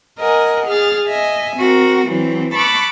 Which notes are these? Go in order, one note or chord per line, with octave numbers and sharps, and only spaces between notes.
A#4 D#5 F#5 G#5
G#4 F6 A6
D#5 E5 G#5
C4 F#4 A#4
E3 F#3 C4
A5 B5 C#6 D6 E6 F#6